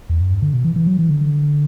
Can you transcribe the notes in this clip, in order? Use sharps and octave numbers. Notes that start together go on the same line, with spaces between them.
E2
F#2
G2
D3
B2
E3
E3
F#3
E3
D3